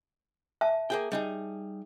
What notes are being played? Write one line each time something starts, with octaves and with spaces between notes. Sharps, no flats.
E5 A5
A#3 G#4 G5
G3 D#4 G#4